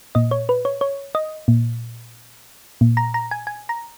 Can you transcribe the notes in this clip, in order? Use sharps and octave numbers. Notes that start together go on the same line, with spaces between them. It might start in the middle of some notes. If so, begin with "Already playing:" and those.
A#2 D#5
C#5
B4
C#5
C#5
D#5
A#2
A#2
A#5
A#5
G#5
G#5
A#5